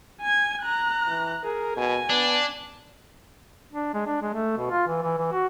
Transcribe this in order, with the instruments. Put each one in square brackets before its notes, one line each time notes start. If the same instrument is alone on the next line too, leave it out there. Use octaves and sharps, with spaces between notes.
[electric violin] G#5 G#6
A#5 F#6
[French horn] E3
[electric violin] G#4 [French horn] A#4
[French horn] B2 [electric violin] G#5
[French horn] B3 [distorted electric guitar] D4
[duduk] D4
G#3
D4
G#3
A3
B2
F4
E3
E3
E3
F#4